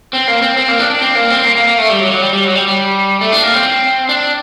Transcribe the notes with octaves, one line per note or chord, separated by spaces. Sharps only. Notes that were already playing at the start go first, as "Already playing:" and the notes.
C4
A#3
C4
C4
A#3
D4
D4
C4
A#3
C4
A#3
A#3
A#3
A3
G3
F#3
F#3
G3
G3
F#3
G3
G3
A3
D4
A#3
C4
D4